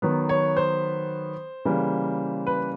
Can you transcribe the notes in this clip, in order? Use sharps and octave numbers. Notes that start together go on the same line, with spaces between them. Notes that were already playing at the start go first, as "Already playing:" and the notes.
D#3 F#3 B3
C#5
C5
C#3 E3 G3 A#3
B4